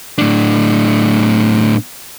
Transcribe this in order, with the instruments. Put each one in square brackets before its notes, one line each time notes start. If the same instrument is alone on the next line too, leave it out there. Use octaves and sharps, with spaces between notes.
[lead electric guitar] A2 D4